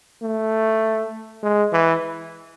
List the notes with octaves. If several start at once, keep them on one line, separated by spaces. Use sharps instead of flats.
A3
G#3
E3